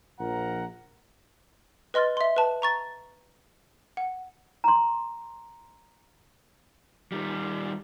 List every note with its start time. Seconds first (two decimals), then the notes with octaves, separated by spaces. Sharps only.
0.20 A#1 F3 A#4 F#5 A#5
1.94 B4 D#5 C6 F6 A6
2.17 E5 C6
2.36 B4 A5
2.62 A#5 C#6 A6
3.97 F#5
4.64 A#5 C6
7.12 D#3 G3